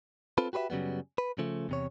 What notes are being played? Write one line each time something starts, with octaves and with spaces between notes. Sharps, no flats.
C4 F4 A4 B4
F#4 G4 B4 C5 E5
F#2 C#3 F#3 G3 B3
B4
C#3 F3 A3
E2 C3 C#5